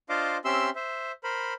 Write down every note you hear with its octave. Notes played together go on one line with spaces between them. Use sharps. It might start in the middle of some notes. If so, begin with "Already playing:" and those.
D4 F4 C5 D#5 F5 D6
C4 C#4 G4 E5 C6 E6
C5 E5
A#4 C5 B5